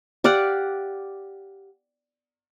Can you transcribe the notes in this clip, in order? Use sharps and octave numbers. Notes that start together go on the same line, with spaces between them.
G4 D5 F5 F#5